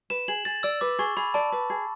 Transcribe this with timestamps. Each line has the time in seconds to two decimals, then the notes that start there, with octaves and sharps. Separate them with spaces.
0.10 B4 E7
0.28 G#4 F#7
0.45 G#4 A6
0.63 D5 E6
0.81 B4 D6
0.99 G#4 C#6
1.17 G#4 B5
1.34 D5 A5
1.52 B4
1.70 G#4